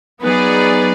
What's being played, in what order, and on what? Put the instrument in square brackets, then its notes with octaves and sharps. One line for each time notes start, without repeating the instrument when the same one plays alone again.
[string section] F#3 B3 D#4 G#4 D5 [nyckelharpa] B4